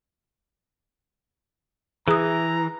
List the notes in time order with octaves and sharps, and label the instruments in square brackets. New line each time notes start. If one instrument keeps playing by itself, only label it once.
[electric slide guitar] E3 [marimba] G#4 D#6 [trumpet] A#5